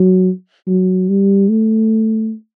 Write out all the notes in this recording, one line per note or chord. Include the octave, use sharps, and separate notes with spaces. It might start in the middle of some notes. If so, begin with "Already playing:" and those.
Already playing: F#3
F#3
G3
A3